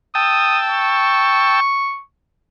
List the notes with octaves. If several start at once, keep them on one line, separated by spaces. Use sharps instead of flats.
G5 A5 D#6 E6
C#6